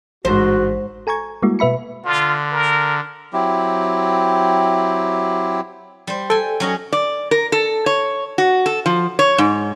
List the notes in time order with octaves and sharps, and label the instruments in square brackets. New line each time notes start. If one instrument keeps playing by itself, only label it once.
[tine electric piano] A1 [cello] G#2 [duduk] F#4 [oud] C5
[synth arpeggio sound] A4 G#5 A#5 C#6 G#6
G3 G#3 A#3 E4 F#4
B2 B4 E5 B5 C#7
[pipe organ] D3 [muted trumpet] F4
[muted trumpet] A#4
[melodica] F#3 C4 E4 G4
[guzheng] G3 C5
[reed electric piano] A4 [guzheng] G5 G#5
[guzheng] F#3 C#4 D#5
[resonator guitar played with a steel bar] D5
A#4
A4
C#5
F#4
A4
F3
C#5
G#2